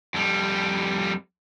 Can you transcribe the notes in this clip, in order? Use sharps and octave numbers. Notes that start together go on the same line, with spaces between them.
F2 G3